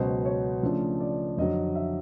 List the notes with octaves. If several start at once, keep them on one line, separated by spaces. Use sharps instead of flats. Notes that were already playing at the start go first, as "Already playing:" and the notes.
Already playing: C#2 B2 F#3 C5
C#5
C#3 F3 A3 D4
D5
F2 D3 F#3 D#5
E5